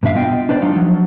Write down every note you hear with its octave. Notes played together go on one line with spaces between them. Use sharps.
G2 B2 D4 E5 F5
B3 F4 D#5 G5
D4 B4 C5 D5
F#3 D4 D#4 F4 F5
F3 F#3